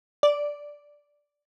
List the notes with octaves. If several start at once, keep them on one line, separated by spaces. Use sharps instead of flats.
D5